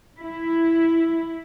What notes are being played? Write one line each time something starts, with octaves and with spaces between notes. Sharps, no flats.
E4